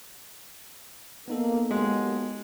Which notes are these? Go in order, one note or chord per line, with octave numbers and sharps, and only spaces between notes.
A#3 B3 D#4 A4
F#3 G#3 A#3 G4